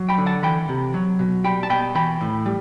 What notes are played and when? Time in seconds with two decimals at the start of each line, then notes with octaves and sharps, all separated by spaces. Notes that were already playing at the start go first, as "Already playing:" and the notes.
Already playing: F#3
0.09 G5 B5
0.18 D3
0.26 F#5 A5
0.43 E3 G5 B5
0.69 C3
0.94 F#3
1.19 B2
1.44 G3 G5 B5
1.63 A5
1.70 B2 G5 B5
1.95 E3 G5 B5
2.21 A2
2.46 G3